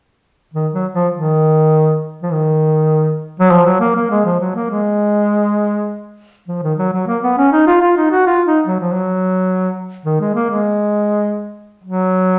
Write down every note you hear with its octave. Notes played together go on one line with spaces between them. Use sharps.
D#3
F#3
F3
D#3
F3
D#3
F#3
F3
F#3
A#3
A#3
G#3
F3
F#3
A#3
G#3
F3
D#3
F#3
F#3
A#3
B3
C#4
D#4
F4
F4
D#4
F#4
F4
D#4
F#3
F3
F#3
D#3
G#3
A#3
G#3
F#3